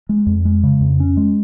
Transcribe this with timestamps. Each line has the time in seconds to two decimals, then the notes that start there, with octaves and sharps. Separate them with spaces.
0.09 G#3
0.26 F2
0.45 G#3
0.64 C#3
0.81 F2
1.00 C#4
1.17 G#3